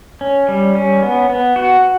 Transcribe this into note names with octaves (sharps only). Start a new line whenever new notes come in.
C#4
G3
C#4
B3
B3
F#4